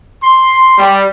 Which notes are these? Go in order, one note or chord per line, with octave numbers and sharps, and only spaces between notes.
C6
G3